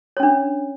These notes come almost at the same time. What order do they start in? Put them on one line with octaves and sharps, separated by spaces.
C#5 C#4 D4